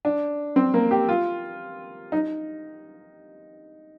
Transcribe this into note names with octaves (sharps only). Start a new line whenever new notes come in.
D4
C4
A#3
G4
F4
D#4